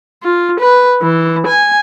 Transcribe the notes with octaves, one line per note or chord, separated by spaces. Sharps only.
F4
B4
E3
G#5